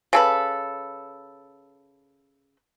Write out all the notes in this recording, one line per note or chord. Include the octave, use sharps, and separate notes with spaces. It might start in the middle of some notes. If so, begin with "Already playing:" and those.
C#3 A4 B4